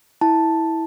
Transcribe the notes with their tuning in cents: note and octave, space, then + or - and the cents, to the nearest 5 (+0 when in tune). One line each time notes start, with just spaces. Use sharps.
E4 -15 A5 +0